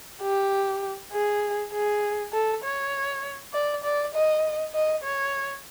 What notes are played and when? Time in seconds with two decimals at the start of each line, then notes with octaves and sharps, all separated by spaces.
0.22 G4
1.12 G#4
1.73 G#4
2.33 A4
2.64 C#5
3.53 D5
3.84 D5
4.14 D#5
4.74 D#5
5.04 C#5